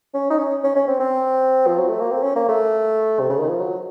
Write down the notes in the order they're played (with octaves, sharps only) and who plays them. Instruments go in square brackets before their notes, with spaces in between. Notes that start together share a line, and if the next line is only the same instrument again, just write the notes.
[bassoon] C#4
D#4
C#4
C#4
C#4
C4
C4
F3
F#3
A3
A#3
C4
C#4
A#3
A3
C3
C#3
D#3
F3
F#3